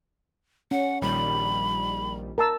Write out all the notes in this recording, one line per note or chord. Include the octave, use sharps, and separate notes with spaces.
C#4 F#5
A#1 D#3 G3 B5
A#4 A5 E6